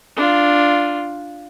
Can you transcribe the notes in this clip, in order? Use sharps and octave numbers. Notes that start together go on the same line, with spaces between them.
D4 F4